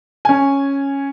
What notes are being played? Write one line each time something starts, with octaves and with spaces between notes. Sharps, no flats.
C#4 G#5